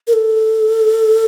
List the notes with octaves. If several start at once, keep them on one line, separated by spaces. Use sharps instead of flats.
A#4
A4